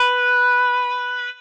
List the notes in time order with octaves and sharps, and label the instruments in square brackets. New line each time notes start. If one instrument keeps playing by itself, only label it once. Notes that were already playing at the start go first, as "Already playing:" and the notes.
Already playing: [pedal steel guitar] B4